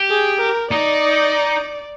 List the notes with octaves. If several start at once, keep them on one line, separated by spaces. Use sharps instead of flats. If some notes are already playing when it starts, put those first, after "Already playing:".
Already playing: G4
G#4
A#4
D#4 D5